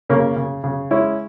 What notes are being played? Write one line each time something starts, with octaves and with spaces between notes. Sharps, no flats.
C#3 A#3 C#4
C#3
C#3
G#3 C#4 E4